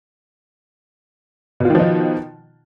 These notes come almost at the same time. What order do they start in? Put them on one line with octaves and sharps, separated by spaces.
B2 F4 D#3 F3 D#4